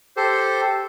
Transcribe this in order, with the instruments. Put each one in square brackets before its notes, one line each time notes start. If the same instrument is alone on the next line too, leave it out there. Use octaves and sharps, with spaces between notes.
[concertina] G4 A4 C5